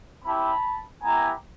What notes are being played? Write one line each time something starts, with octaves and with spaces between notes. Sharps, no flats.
C4 E4 G4 A5 B5
B3 E4 G4 G#5 A#5